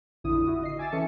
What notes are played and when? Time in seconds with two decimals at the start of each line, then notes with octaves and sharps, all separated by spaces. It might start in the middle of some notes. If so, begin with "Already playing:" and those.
0.24 A1 F2 D3 E4 D#6
0.45 E4 F#4 D#6
0.61 D3 D#5 C7
0.78 E5 G#5 D6 E6 A6
0.92 E3 C#4 A4 E5 G#5 C#7